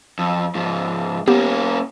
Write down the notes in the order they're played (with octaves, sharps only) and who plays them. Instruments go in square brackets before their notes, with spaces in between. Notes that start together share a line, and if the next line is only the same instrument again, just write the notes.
[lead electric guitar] F2
G#2 F3
[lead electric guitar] A#3 C#4 [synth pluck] B3 G4